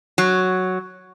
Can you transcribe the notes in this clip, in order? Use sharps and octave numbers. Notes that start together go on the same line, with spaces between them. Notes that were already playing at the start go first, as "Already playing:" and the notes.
F#3